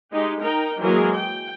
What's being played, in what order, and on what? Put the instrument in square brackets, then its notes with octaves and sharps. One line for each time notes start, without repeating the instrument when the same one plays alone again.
[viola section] G#3 D#4 G4
D#4 A#4 G5 A#5
E3 F#3 G#3 A#3 G#4 A#4
G5